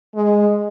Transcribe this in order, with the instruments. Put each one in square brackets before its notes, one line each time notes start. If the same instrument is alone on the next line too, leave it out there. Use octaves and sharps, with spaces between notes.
[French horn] G#3